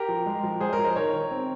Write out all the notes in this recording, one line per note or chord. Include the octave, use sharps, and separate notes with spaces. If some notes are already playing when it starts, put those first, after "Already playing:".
Already playing: G4 A#4
F3
G#3
F3
G#3 G#4 C5
A#4 C#5
F3
C5 D#5
D#3 A#4 C#5
D#3
C4